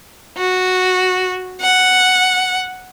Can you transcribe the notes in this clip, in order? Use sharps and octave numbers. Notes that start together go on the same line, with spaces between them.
F#4
F#5